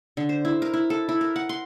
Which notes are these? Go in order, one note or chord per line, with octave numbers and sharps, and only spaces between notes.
D3
C5
E4
A#4
E4
A4
E4
A#4
F#5
C6